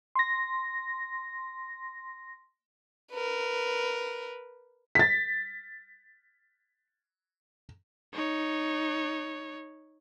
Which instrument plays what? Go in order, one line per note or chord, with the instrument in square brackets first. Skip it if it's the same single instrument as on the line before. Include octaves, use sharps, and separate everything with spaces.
[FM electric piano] C6 A#6
[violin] A#4 B4
[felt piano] A6 B6
[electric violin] D#4 C#5